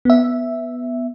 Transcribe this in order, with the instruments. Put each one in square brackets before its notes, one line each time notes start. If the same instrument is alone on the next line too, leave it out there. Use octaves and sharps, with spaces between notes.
[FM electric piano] B3 E5